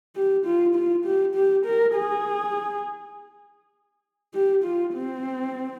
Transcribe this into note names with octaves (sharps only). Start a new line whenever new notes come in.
G4
F4
F4
G4
G4
A#4
G#4
G4
F4
C4